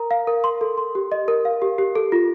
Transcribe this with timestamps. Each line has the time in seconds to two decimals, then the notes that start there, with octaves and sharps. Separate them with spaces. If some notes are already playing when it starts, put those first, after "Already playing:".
Already playing: A#4 A#5
0.11 F5
0.27 A#4
0.44 C6
0.61 A4
0.78 C6
0.95 G4
1.12 D#5
1.28 A#4
1.45 F5
1.62 G4
1.78 G4
1.95 A4
2.12 F4